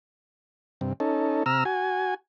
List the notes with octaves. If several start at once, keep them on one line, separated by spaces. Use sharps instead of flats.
G2 C3
C#4 D#4 A4
C3 A#5 E6 F6
F#4 G#5